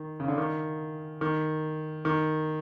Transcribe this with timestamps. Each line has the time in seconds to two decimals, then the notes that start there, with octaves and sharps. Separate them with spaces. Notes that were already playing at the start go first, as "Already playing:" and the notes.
Already playing: D#3
0.20 C#3
0.28 D3
0.38 D#3
1.21 D#3
2.05 D#3